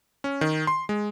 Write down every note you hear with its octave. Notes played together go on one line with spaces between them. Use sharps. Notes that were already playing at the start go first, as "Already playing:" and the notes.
C#4
D#3
C6
G#3